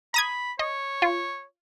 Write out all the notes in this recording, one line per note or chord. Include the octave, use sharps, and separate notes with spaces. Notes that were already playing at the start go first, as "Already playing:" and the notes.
A#5 B5 D#6 G#6
C#5 D#5
F4